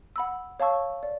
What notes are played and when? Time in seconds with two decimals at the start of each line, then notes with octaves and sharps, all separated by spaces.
0.16 F#5 B5 E6
0.60 C#5 F5 A5 C#6 E6
1.03 D5